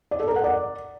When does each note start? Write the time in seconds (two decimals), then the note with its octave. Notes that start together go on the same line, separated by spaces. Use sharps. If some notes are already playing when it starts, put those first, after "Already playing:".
0.11 D5
0.20 A4
0.28 A#4
0.36 F#5
0.44 D5